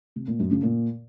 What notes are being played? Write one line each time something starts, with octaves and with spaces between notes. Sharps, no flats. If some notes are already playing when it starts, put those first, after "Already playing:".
C3
A#2
F#2
C#3
A#2